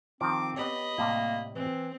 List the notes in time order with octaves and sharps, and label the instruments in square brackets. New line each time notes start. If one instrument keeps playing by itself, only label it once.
[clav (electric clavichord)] D#3 F3 [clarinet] C4 [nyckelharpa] D6
[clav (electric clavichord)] B3 G4 C#5 [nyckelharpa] D#5 B5
[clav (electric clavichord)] A2 C3 G3 [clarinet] A#3
[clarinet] E3 [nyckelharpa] C4